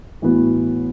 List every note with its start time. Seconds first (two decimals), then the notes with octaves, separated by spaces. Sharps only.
0.22 A2 E3 B3 F#4